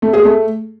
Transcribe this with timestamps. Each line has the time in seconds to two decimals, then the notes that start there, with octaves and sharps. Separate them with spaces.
0.02 A3
0.13 G#4
0.25 A3